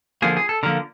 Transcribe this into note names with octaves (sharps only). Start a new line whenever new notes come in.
D3 F3 A#3 G#4
G#4
A4
D3 F3 A#3 A#4